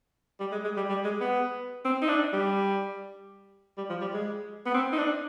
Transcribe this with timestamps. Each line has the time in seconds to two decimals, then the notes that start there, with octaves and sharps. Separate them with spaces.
0.40 G3
0.52 G#3
0.64 G#3
0.77 G3
0.89 G3
1.05 G#3
1.21 B3
1.85 C4
2.02 D#4
2.09 D4
2.33 G3
3.78 G3
3.90 F3
4.01 G3
4.14 G#3
4.66 B3
4.74 C4
4.92 D#4
4.98 D4